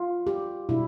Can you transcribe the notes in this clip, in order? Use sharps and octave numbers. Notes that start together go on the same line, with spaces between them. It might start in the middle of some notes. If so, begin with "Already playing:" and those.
Already playing: F4
G4
B2 G3 D4 E4